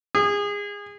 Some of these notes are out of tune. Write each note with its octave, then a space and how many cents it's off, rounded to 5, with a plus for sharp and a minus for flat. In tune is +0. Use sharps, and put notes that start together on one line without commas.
G#4 -25